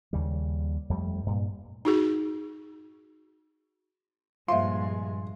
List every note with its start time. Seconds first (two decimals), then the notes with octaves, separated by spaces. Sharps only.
0.13 D#2 C#3 G3
0.90 F2 G3 A3
1.26 G2 A#2
1.85 D#4 F#4 G#4
4.48 G2 A#2 F3 G#3 E5 F5 C6